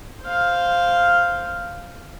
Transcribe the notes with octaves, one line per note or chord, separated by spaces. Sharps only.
C5 F5